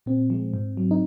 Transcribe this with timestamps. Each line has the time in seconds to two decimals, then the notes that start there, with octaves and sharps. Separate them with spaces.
0.06 A#2 C4
0.30 F3 G#3
0.54 G#2
0.77 F#3
0.91 D#4